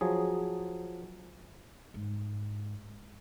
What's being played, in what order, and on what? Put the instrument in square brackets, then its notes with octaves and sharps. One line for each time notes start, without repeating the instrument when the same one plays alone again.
[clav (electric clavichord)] F3 F#3 G#4
[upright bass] G#2